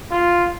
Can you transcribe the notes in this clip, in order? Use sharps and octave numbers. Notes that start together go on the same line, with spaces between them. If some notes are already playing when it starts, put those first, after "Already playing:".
F4